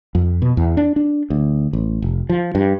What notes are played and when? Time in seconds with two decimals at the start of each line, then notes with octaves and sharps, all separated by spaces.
0.15 F2
0.42 B2
0.57 E2
0.77 D4
0.96 D4
1.30 D2
1.73 A1
2.02 F1
2.29 F3
2.55 G2